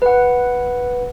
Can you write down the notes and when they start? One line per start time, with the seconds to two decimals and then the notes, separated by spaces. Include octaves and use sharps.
0.02 B4 F#5